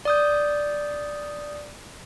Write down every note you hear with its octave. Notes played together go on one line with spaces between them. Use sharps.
D5 D#6 G6